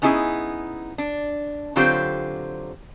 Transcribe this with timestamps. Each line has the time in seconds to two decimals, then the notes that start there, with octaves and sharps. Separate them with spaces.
0.02 B3 C#4 D#4 E4 G#4
0.98 D4
1.76 D3 F#3 C4 F4 G4 C5